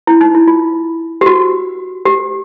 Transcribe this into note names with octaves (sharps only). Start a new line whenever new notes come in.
E4
D#4
E4
F4
G4
F#4
G4